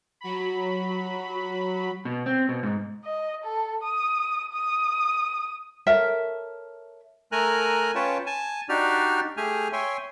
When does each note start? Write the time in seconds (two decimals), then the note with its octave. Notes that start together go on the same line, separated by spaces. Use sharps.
0.21 F#3 B5
2.05 B2
2.26 C4
2.49 B2
2.63 G#2
3.05 D#5
3.44 A4
3.83 D#6
4.53 D#6
5.87 A4 A#4 C#5 E5
7.32 A3 A#4 G#5 A#5 F#6
7.95 C#4 F4 B4 C#5 G5 A5
8.26 G#5 A5
8.69 D4 D#4 F#4 G4 D5 F6
9.37 A3 G4 G#4 G#5 F6
9.73 C#5 E5 G5 G#5 C6